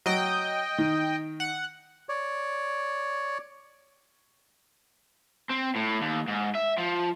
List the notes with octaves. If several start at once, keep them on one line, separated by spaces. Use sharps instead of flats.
F#3 D#5 G5
D#3
F#5
C#5 D5
C4
A2
D#2
G#2
E5
F3